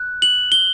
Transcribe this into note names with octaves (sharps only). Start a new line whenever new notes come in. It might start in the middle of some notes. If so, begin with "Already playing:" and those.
Already playing: F#6
F#7
G7